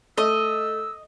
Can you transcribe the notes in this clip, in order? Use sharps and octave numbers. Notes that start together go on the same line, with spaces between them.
A3 D#5 E6